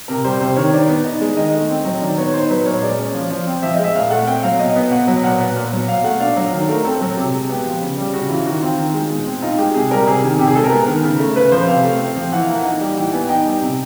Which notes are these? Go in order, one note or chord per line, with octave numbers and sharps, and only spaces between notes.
C3 A#4
G3 C5
C3 C5
D#3 C#5
D#3 D5
B3
D#4
G#3
D#3 D#5
A3
C4
F#3
D#3 D5
B3 C#5
D#4 C5
F#3 B4
A#2 C#5
G#3 D5
C#4
F3
F3
C4
F3 E5
D#5
G#3
E5
A#2 F5
A3 F#5
C4 G5
F#3 F5
B2 D#5
B3
B2 F#5
F#3
A#2 F#5
B3
A#2
F#3
B2 F5
A3 F#5
D4 F5
F#3
D#3
A3 A#4
C4 A4
F#3
C3
G#3
B3 G4
F3
C#3
G3
C#3 F#4
E3 F4
D#3 F#4
C4 F4
D#3
G#3
B2
C4
D#4 F4
G#3 G4
C3 G#4
G3 A#4
C3 G#4
D#3
C3 G4
G#4
G#3 A4
A#4
B3
D#3
C#3
A3
C#3 B4
F3 C5
C3 F5
A3
C4
F3
E3 F#5
F5
A#3 F#5
D#4
G3
E3 G5
B3 G#5
D#4 G5
G3
C3